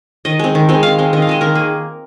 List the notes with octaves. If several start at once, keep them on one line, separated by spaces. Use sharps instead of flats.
D#3 D#5
G#3 C4
D#3
G#3 C4
D#3 F5
G#3 C4
D#3 D#5
F5
G#3 C4 D#5
D#3 A#4
A#3 G#4